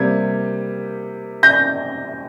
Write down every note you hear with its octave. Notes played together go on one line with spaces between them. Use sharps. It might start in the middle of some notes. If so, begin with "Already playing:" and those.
Already playing: C3 G3 A#3 G#6
G6 A#6